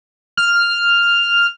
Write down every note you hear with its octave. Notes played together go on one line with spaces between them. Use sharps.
F6